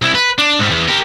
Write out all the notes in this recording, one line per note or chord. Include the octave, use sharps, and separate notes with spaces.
C2 E4
B4
D4
G#2 G3
E2
G4 A#4